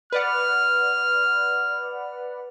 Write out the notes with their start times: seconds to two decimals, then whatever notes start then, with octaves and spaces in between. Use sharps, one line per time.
0.12 B4 D5 F#5 F6